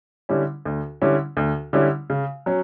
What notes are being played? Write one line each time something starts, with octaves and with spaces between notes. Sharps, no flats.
D3 G3 C#4 E4
D2
D3 G3 C#4 E4
D2
D3 G3 C#4 E4
C#3
F#3 C#4